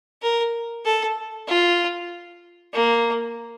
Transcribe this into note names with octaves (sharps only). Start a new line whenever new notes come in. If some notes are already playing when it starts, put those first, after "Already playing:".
A#4
A4
F4
A#3